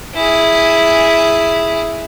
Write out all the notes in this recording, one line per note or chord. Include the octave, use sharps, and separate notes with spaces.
E4 G#4